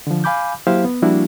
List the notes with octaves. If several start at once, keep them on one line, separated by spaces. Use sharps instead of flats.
D3 F3
F5 G#5 B5 D6 G6
F#3 A#3 E4 G4 C5 F5
B3
F3 G3 A#3 D4 E4 F#4